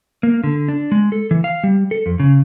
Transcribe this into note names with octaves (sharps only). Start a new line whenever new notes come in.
A#3
D3
D4
G#3
A4
E3
F5
G3
A4
F2
C#3